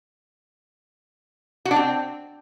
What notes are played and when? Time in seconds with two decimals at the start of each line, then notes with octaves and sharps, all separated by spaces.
1.65 F#4
1.71 D4
1.76 C4